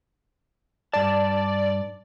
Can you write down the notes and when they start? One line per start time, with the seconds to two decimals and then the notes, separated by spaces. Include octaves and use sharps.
0.93 G2 D5 A5